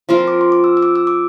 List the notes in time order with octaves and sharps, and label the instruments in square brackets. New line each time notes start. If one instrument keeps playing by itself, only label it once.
[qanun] F3 C4 F4 A#4 [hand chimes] C6
[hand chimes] D6
C6
D6
E6
E6
D6
E6
D6